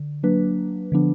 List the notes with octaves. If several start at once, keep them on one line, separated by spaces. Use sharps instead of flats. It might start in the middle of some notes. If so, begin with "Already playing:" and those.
Already playing: D3
F#3 A#3 D4 B4
D3 F3 B3 D4